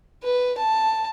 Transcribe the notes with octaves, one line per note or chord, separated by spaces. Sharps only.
B4
A5